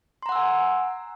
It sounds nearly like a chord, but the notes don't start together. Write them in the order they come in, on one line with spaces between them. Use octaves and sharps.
C6 A#5 F#5 E6 G#5